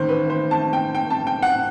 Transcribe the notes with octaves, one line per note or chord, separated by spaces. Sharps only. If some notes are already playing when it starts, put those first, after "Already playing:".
Already playing: A1 D#3 C5
B4
C5
A5
G5
G5
A5
G5
F#5